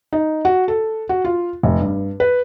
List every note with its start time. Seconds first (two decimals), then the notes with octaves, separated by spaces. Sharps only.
0.13 D#4
0.45 F#4
0.68 A4
1.09 F#4
1.25 F4
1.63 F1
1.80 G2
2.20 B4